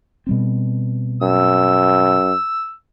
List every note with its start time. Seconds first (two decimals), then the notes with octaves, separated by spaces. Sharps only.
0.27 B2 G3 C4
1.22 F#2 E6